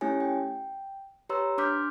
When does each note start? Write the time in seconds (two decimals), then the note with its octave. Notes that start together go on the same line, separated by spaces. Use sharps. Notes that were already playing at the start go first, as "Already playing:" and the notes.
0.01 A3 C#4 E4 G4 C#5 G#5
0.20 G5
1.29 G4 B4 C#5 A#5 C6 E6
1.58 D4 C6 D6 F6 G6 B6